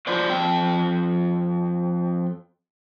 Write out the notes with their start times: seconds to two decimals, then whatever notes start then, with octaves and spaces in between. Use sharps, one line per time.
0.07 F4 F#4 C5 D5
0.30 F2 G5